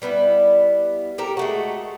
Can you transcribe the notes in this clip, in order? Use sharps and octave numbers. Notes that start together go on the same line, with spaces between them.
G3 B3 D#4 E4
G4 A4 A#4
G#3 A3 F#4